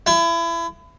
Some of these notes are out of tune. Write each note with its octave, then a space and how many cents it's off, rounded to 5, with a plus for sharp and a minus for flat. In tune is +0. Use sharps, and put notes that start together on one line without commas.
E4 +30